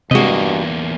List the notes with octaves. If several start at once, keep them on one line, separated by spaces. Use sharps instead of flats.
E2 G2 C3 G#3 A#3 F#4 D#5